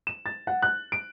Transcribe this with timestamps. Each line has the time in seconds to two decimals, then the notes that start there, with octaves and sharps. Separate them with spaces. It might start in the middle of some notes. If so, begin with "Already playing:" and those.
0.07 E7
0.26 A6
0.47 F#5
0.62 F#6
0.92 D7